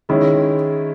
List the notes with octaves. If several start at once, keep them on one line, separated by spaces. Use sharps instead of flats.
D#3 G#3 C#4 E4